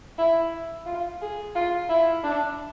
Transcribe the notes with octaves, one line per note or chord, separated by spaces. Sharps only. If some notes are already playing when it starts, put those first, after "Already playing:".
E4
F4
G#4
F4
E4
D4